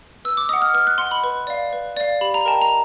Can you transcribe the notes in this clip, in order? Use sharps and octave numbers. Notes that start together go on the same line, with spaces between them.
B4 E6
D6
D#5 F#5 D#6
F6
B4 F6
F#6
D#5 F#5 C6
B5
B4
D5 F5
B4
D5 F5
G4 B5
A#5
A#4 D#5 G5 A5
A#5